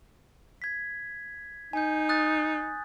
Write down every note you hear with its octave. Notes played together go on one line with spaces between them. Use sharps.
G#6 B6
D#4 G#5 G6
D#6 F#6 A6